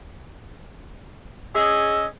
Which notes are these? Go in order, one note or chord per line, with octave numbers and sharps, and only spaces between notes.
C#4 G#4 D#5 E6